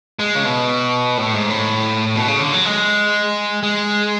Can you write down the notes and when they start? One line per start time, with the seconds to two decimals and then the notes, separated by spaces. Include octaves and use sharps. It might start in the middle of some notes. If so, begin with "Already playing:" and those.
0.19 G#3
0.35 C#3
0.44 B2
1.18 A2
1.34 G#2
1.50 A2
2.16 B2
2.28 C#3
2.40 D3
2.53 F#3
2.65 G#3
3.63 G#3